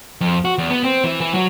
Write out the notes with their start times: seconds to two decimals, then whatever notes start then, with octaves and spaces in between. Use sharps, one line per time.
0.21 F2
0.45 F#4
0.58 E2
0.70 B3
0.83 C4
1.05 E3
1.21 E3
1.34 F#3